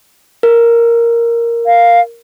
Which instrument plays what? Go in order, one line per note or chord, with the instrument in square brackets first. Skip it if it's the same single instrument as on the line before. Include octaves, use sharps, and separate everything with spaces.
[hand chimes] A#4
[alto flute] F5